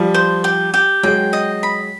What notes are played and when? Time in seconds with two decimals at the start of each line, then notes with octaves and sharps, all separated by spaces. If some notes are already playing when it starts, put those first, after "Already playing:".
Already playing: F3 G3
0.14 C5
0.44 G4
0.74 G4
1.03 F#3 G#3 G5
1.33 D#5
1.63 B5